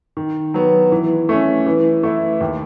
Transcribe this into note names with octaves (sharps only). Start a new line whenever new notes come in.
D#3
F#3 B3
E3
A3 C#4
E3
A3 E4
D#2